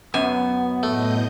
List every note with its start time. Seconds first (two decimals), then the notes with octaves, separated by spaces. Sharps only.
0.14 F#2 B3 G#5
0.83 A2 A3 D#5 G6